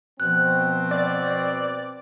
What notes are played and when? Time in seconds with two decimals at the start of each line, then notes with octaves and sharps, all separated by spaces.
0.20 B2 F3 C4 F#6
0.91 D5